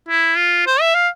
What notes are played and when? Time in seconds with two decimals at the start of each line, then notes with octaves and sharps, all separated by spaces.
0.09 E4
0.37 F4
0.67 C5
0.81 E5
0.95 F5